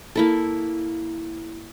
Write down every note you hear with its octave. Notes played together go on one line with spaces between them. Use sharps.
A#3 E4 A4